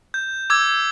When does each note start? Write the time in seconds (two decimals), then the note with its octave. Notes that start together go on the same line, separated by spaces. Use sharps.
0.14 G6
0.50 D6 E6 G#6